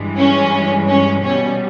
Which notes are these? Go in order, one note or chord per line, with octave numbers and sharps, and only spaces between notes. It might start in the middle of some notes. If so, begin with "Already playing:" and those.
Already playing: G2 E3 G#3
C#4
C#4
B2 G3 C#4